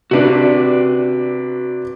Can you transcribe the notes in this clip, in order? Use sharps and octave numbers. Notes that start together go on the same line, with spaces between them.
C3 D4 F#4 B4 D5